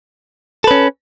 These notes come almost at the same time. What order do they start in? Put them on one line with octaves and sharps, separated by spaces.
A4 B4 C#4